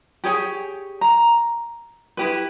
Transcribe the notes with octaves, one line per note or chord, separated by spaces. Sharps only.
G4 G#4 C#5 G5
A#5
E4 G4 B4